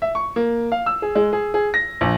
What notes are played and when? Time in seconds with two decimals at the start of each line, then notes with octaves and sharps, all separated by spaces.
0.02 E5
0.15 C#6
0.36 A#3
0.72 F5
0.86 E6
1.02 G#4
1.15 G#3
1.33 G#4
1.54 G#4
1.74 A#6
2.01 A#1